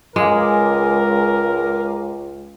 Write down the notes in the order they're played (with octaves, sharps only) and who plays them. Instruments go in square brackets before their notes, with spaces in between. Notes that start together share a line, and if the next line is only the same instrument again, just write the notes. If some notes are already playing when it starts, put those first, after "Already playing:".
[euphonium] C#2 [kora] G#3 [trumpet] A#4 [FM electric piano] F5 G#5 D6